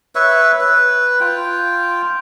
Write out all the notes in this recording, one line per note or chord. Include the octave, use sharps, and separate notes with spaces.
B4 C#5 E5
B4
F4 G5